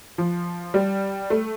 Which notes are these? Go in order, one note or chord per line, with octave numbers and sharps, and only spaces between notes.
F3
G3
A3